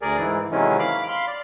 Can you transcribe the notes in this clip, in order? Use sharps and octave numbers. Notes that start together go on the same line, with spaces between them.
D2 G#4 A#4 D5
G#2 E3
C3 D#3 E3 F#3 G#3 C#4
F5 B5 D6
F5 B5 C6
D5